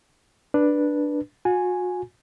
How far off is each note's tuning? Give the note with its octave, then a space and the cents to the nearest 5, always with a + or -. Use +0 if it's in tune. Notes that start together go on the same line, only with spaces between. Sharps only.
D4 +5 B4 -15
F#4 -40 G#5 +0